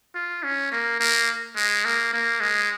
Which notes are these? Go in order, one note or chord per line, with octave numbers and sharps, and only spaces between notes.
F4
C#4
A#3
A#3
G#3
A#3
A#3
G#3